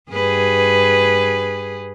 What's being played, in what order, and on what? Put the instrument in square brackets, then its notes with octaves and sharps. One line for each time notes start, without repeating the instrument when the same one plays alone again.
[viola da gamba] G2 G#4 B4